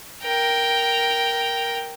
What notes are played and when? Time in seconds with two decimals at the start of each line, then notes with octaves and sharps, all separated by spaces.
0.23 A#4 G5